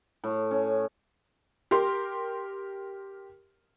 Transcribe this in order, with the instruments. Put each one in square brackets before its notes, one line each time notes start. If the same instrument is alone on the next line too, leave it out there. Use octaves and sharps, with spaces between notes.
[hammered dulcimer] A2
C#4
[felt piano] G4 A#4 C6